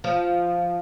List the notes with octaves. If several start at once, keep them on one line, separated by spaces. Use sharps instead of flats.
F3